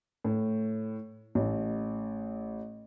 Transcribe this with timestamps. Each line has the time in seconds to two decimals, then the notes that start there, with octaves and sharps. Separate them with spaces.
0.24 A2
1.35 A1